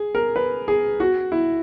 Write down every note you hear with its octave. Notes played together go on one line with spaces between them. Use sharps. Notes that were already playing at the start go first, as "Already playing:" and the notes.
Already playing: G#4
A#4
B4
G#4
F#4
E4